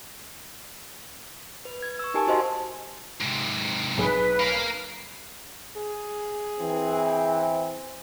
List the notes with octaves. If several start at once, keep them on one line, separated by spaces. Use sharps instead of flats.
B4
G#6
C#6 E6
D#4 G4 A#4 G#5 A5
F#4 C5 D#5 F5 C6
G#2 C3
B1 G#4 B4 G7
A#4 F5
G#4
E3 C4